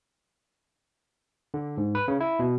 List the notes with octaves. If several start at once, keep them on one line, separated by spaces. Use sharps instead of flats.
D3
G#2
B4
C#3
E4
B2